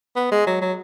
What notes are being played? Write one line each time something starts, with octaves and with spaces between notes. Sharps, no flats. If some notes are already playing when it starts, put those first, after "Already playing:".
B3
G#3
F#3
F#3